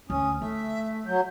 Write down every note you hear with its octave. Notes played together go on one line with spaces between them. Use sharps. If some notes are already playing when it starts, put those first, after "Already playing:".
D2 C#4 D#6
A3 D#4 E5
F#3 G6